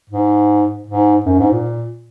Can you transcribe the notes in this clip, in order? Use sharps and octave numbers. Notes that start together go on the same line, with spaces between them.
G#2
G#2
F#2
G#2
A#2